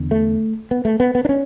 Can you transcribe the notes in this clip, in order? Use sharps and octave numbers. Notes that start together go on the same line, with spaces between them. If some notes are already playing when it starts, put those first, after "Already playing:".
Already playing: E2 D3
A3
B3
A3
B3
B3
D4
C#4